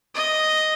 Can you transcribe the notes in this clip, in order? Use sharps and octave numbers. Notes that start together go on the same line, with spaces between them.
D#5